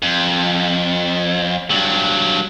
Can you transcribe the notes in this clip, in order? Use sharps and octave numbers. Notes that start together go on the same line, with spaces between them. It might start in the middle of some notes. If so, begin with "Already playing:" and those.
F2
G2 F#3